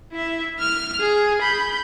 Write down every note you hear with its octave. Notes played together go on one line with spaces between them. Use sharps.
E4 E5
F6
G#4
B5 G6